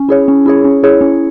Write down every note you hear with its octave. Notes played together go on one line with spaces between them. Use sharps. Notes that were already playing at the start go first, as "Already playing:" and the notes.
Already playing: C#4
E4 G#4 C#5
C#4
E4 G#4 C#5
C#4
E4 G#4 C#5
C#4